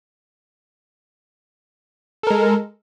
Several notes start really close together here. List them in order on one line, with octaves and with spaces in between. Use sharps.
A4 A#4 G#3